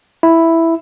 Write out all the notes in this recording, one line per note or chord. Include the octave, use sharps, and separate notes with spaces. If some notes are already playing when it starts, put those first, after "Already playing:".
E4